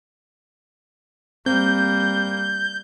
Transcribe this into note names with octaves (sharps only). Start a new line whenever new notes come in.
G3 A#3 C4 G6